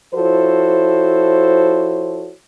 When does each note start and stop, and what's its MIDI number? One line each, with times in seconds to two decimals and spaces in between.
0.15 2.31 53
0.15 2.31 64
0.15 2.31 66
0.15 2.31 69
0.15 2.31 72
0.15 2.31 73